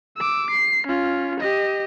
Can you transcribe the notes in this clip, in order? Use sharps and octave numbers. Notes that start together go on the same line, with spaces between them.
D6 E6
C7
C#4 F4
G4 D#5